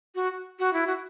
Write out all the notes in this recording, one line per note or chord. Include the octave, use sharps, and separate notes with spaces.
F#4
F#4
E4
F#4